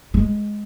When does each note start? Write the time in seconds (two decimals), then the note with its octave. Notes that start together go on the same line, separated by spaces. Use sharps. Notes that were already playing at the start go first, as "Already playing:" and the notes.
0.14 G#3